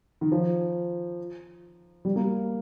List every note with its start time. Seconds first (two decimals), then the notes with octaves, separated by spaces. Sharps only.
0.21 D#3
0.32 F3
2.05 G3
2.16 A#3